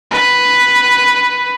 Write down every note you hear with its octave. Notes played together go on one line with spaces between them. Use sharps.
B4